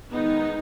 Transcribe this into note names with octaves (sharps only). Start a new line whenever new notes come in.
D#3 G#3 B3 D#4